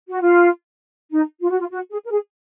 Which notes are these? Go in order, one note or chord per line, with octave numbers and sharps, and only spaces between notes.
F#4
F4
D#4
F4
F#4
F4
F#4
G#4
A#4
G#4